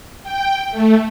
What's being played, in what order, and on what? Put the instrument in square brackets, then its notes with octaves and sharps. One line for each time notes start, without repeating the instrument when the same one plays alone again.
[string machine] G5
A3